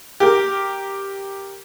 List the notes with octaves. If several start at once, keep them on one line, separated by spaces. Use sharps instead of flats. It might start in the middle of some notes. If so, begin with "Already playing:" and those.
G4 A#4